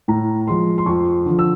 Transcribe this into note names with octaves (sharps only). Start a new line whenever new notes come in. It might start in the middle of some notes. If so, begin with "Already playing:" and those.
A2 A#5
F3 G#3 C6
C6
F2 C#6
D3 F3
E6